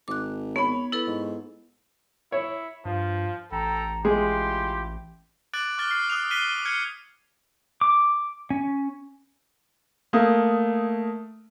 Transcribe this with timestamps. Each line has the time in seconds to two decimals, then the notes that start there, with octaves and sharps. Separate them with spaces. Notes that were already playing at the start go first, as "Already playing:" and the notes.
0.08 G#1 D6 F#6
0.56 B3 C#5 B5
0.92 E4 A4 B4
1.07 G#2
2.32 E4 C#5
2.85 G2 F3 F4
3.52 A1 A4 G5 A#5
4.05 G#3 E4 F4 G4 C6
5.54 D6 F#6 A6 D7 F#7
5.78 C#6 D6 F6 F#6 A6 G7
5.91 F6 C7
6.10 D#6 F6 F#6 C7 F7
6.31 F6 F#6 B6 C7 D#7 G7
6.65 F6 F#6 G#6 C7 C#7
7.81 D6
8.50 C#4
10.13 A3 A#3 D#6